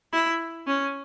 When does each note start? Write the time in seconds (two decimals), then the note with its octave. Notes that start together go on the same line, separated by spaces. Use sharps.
0.13 E4
0.67 C#4